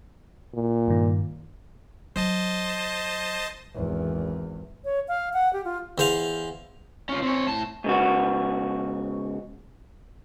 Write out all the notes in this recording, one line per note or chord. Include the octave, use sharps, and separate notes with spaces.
A#2
G2 D#3
F#3 C5 D#5 A5
G#1 E2
C#5
F5
F#5
G4
F4
E2 C5 F5
C#4 F4
C4 C#5
A2 A5
G#2 C#3 F#4